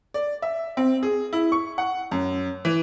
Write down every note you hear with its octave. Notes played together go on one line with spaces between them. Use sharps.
D5
E5
C4
G#4
E4
C#6
F#5
F#2
E3